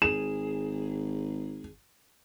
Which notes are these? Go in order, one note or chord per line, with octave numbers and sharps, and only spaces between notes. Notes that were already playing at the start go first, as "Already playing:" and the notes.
G#1 G#4 E7